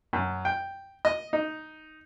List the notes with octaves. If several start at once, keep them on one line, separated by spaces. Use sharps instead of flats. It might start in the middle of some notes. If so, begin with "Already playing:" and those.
F#2
G5
D#5
D#4